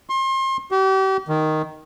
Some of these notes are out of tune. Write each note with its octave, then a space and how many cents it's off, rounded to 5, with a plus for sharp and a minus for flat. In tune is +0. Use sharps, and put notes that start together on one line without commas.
C6 +35
G4 -40
D#3 +0